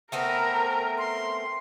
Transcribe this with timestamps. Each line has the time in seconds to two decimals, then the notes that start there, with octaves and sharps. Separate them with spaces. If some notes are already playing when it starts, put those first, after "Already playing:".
0.12 A3 B3 C4 A#4
0.98 C6